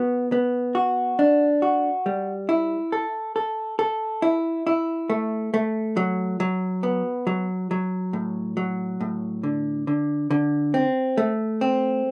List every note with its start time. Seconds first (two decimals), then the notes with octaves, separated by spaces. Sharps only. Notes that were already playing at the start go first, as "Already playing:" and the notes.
Already playing: B3 F#4
0.32 B3
0.75 F#4
1.19 D4
1.62 F#4
2.06 G3
2.49 E4
2.92 A4
3.36 A4
3.79 A4
4.22 E4
4.67 E4
5.10 A3
5.54 A3
5.97 F#3
6.40 F#3
6.83 B3
7.27 F#3
7.71 F#3
8.13 A2
8.57 F#3
9.01 A2
9.43 D3
9.87 D3
10.31 D3
10.74 C4
11.17 A3
11.61 C4